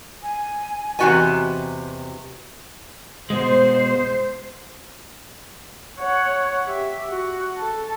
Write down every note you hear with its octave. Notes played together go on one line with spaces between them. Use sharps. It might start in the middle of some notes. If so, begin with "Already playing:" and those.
G#5
E2 C3 G3 F#4 D#5 G#5
B2 G#3 C5
C#5 F#5
G4 E5
F#4
A4 A5